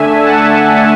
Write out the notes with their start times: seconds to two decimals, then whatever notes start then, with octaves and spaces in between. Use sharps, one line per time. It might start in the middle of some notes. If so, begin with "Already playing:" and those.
Already playing: D3 A3 D4 E5 G#5
0.25 F#5 A5